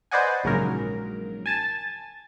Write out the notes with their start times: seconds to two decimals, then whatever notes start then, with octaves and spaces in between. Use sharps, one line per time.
0.11 B4 C5 D5 D#5 F#5 G#5
0.44 A#1 G#2 C#3 F#3 A#4
1.46 G#5 A5 A6